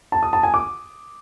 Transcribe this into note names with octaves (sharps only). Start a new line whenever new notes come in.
A5
D#6
A5
G#5
D6